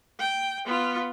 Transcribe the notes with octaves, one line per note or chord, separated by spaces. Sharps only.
G5
B3 F4